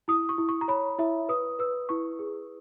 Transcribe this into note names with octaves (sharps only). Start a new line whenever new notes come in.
E4 D#6
C#6
E4
C#6
A#5
C#5 B5
E4 E5
B4 D#6
B4 E6
E4 C#6
G#4